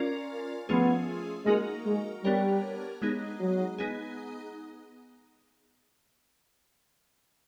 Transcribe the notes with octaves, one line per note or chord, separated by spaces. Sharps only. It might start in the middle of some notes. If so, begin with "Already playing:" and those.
Already playing: C#4 F4 A#4 D5
F3 A3 B3 C#4 F4 G#4
G#3 A#3 D#4 F#4 A#4
G#3
G3 B3 D4 G4 A#4 C#5
G#3 B3 D#4 G#4
F#3
B3 D#4 G#4